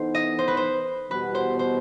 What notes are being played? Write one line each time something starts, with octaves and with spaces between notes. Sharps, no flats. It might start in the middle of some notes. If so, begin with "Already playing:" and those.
Already playing: E3 B3 D#4 A4 C5
D#5
C5
B4
C5
E2 B2 G3 B3 F#4 B4
C5
C5